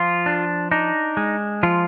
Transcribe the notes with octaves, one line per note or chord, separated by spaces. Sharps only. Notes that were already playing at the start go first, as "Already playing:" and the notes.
Already playing: F3 F4
D4
D4 D#4
G#3
F3 F4